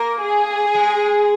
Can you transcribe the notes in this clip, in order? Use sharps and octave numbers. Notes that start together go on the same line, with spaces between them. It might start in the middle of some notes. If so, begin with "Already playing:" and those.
Already playing: A#3 A#4
G#4
G#3